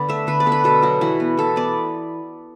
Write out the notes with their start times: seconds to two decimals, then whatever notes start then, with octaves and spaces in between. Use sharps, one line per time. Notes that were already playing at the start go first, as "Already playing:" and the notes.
Already playing: D3 B3 D5
0.09 A3 E5
0.27 D3 B4
0.40 D5
0.46 B3 A4
0.52 B4
0.64 B2 A4
0.82 F#3 B3 F#4
1.01 E3 F#4
1.20 B3
1.37 E3 A4
1.56 B3 D5